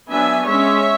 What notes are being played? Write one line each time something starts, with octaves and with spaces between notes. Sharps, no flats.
F#3 B3 D4 E5 G#5
G#3 C#4 C#5 E5